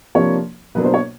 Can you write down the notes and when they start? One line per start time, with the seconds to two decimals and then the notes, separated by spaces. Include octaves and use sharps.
0.15 C3 F3 A#3 D4 C#5
0.75 B2 F#3 A#3 D4 B4
0.84 C5
0.94 C#5